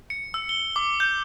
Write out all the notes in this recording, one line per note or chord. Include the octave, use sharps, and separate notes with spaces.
C#7
E6
G7
D6
G6